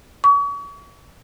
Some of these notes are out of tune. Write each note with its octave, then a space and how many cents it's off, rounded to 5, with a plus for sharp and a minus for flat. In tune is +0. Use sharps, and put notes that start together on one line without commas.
C#6 +40